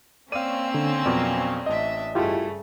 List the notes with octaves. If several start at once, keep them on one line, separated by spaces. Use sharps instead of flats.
A#3 C4 C#4 D5 F5 E6 D#7
D3
F2 B2 F#3 D5
A1 D4 D#5 E5
G2 C#3 A3 E4 F4 G4